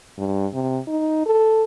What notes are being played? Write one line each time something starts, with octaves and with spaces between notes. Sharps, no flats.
G2
C3
D#4
A4